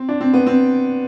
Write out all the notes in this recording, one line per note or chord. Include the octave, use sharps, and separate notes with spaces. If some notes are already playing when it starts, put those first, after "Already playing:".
Already playing: C4
D4
C4
B3
C4